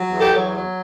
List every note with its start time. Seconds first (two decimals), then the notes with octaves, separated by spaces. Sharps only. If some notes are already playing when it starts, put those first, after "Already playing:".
Already playing: F#3
0.12 E2
0.19 G4 A4
0.33 F#3
0.54 F#3